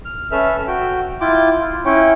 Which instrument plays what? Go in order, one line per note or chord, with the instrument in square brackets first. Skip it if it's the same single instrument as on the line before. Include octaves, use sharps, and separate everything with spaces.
[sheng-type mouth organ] F6
C#4 A4 B4 E5 E6 F6
F#4 G5
E4 F4 G5 D6
F4
C#4 E4 C#5 G5